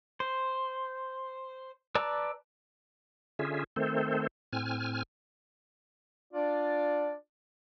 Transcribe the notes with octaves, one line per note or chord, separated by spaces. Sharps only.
C5
B4 D5 A5 A#5 E6
D3 C#4 F4 G#4 E5
D#3 A3 C4 A4 C5
A2 C4 G#5 F6
D4 F4 D5